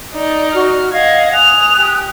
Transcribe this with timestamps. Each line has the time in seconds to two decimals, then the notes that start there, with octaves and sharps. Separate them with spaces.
0.14 D#4 D5
0.53 F#4 F6
0.93 D#5 F5 F#5 G#6
1.33 G#5 D#6 F#6 F7
1.78 G4